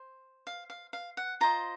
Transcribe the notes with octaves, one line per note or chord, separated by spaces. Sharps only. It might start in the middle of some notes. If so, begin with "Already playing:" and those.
Already playing: C5
F5
F5
F5
F#5
F4 C5 D#5 A#5